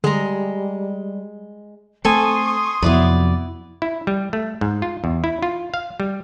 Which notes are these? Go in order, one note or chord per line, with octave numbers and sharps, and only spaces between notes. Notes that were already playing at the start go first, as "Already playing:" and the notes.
D3 G3 G#3 G#4 A#5
A3 C4 A4 G#5 C6 C#6 D#6
F2 C3 F#3 B3 E4 B4 D5
E4
G3
A3
G#2
F4
E2
E4
F4
F5
G3